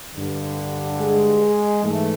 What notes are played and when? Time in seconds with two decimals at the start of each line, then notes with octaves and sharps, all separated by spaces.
0.14 G2 D3
0.98 G#3
1.83 G#2 E3 A3